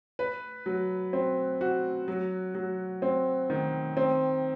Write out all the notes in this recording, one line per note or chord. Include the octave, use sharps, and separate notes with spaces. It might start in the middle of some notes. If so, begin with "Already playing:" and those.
B4
F#3
C4
F#4
F#3
F#3
C4
D#3
C4